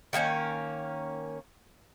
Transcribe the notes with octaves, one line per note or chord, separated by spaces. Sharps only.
D#3 A3 A#3 C#4